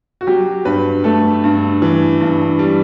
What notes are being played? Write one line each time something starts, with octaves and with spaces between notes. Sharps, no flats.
F#4
F#3 G4
G2 B4
A3 A4
G2
E3
G2
G3